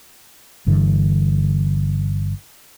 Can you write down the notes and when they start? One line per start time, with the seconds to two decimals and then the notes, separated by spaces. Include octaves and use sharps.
0.66 G1 G2 D3 E3